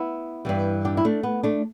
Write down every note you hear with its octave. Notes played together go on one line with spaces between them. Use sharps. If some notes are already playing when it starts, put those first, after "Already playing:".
Already playing: B3 E4
G2 E3 G3
D4 G4
E4
A3 D4
B3
A3 D4